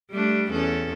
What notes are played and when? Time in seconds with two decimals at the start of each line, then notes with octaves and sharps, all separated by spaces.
0.11 G3 A3 D4
0.51 E2 C#4 A4